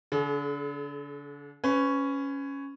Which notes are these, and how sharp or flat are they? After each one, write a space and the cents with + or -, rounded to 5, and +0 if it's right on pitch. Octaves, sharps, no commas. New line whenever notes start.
D3 -35 G#4 +45
C#4 +0 B4 +30